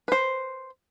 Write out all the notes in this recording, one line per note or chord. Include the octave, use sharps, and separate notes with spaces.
B4 C5